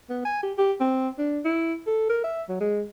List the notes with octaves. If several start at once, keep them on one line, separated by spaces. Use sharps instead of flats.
B3
G#5
G4
G4
C4
D4
E4
A4
A#4
E5
F#3
G#3